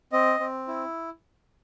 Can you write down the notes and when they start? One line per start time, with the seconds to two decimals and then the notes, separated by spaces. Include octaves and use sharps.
0.12 C4 D#5
0.40 C4
0.68 E4